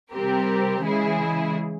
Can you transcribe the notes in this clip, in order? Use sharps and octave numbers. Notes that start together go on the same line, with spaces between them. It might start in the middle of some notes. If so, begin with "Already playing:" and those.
C3 G3 C4 G4 A#4
C#3 E3 G#3 E4 G#4